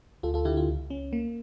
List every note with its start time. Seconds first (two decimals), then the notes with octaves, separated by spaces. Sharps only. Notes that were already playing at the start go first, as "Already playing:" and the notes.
0.23 D2 F4 A4
0.34 F4 A4
0.45 D3 E4 G4
0.57 F4
0.68 C#2
0.90 C#4
1.13 A#3